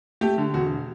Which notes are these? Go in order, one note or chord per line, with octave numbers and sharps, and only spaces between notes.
A3 G4
D3
E1 F#4